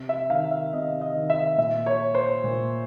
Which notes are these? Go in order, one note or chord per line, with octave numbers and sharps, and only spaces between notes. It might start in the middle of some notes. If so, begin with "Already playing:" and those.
Already playing: C3
E5
D#3 F5
E5
C3 D#5
D#5
D#3
E5
A#2 E5
C#5
C5
A#2